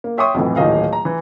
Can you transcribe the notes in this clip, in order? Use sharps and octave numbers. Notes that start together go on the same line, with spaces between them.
A#3
C#5 E5 G5 C6 C#6 D#6
B1 F2 A2 E3
D1 A#2 D#3 D#5 F5
A#5
E3